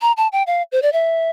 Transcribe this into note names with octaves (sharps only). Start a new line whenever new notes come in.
A#5
A5
G5
F5
C5
D5
E5